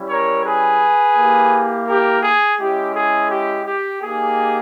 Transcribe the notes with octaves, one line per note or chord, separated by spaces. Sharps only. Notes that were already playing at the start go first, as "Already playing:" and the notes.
Already playing: G3 C#4 E4
A#4 C#5
G#4 B4
A#3 E4 G4
G4 A#4
G#4
G#3 C#4 E4 G4
G#4
G4
G4
A#3 D#4 G4 G#4